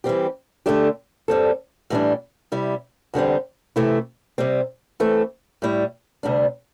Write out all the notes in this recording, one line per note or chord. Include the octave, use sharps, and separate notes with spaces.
E3 G3 C4 G4
D3 A3 D4 G4
G2 G3 C4 A4
A2 E3 G3 D4
C3 G3 E4
E2 D3 G3 C4
C3 E3 A3 E4
C3 G3 C4
E3 A3 C4 A4
A2 G3 E4
D2 C3 G3 D4